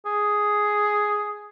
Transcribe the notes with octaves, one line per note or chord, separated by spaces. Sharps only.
G#4